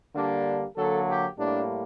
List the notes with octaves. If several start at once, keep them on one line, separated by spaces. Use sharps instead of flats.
D3 G3 A#3 D4
D3 F#3 A#3 A4
G4
A2 G3 A#3 D4